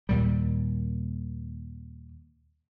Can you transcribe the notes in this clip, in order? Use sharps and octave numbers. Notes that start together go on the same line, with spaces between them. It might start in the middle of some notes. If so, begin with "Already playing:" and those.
D#2 A#2 G3